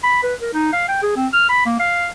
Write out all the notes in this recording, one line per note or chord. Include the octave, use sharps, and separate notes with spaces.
B5
B4
A#4
D#4
F5
G5
G#4
C4
F6
B5
A#3
F5